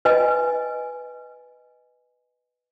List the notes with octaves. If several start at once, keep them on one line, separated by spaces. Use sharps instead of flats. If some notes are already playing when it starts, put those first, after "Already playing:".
B4 D#5 G#5